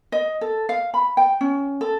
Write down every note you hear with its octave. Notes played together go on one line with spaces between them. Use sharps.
D#5
A4
F5
B5
G5
C#4
A4